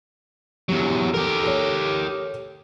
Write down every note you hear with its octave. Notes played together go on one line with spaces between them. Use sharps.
E2 F#3 G4
G4 A4 A#4
A4 C#5